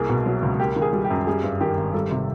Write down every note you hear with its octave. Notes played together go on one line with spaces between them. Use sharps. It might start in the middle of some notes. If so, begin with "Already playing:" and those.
Already playing: C2 A#3 G#4
B2
F#3
C#2
A#3 G4
D#3
G#4
G3
G4
F#2
G3 G#4
G2
D#3 G4
G#1
G3 A4
C3